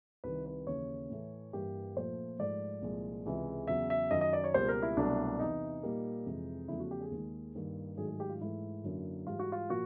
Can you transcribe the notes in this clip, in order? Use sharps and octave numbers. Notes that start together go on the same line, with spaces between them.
C2 C3 D#3 B4
B4
D#2 C#3 E3 C#5
A2 E3 A3
G2 E3 G3 A#3 G4
A#2 F3 A3 C5
G#2 F3 A3 D5
C2 A#2 F3 G#3
C#2 C3 E3 G#3
E2 C#3 F#3 E5
E5
F#2 D#3 F#3 D#5
D#5
D5
C#5
C#2 B2 G3 A#3 C5
A#4
E4
C2 B2 F#3 A3 D4
E2 C3 E3 D#4
A#2 G3 A#3
F2 C3 E3 G#3
E2 C#3 F3 A3 E4
F#4
G4
G#4
D#2 D#3 G#3
G2 D#3 G3 A#3
G#2 D#3 F#3 A3 G#4
G#4
G4
F4
G#2 E3 A3 E4
F#2 D3 F#3 A#3
G#2 E3 G3 F4
F#4
F4
A#2 F3 A#3 F#4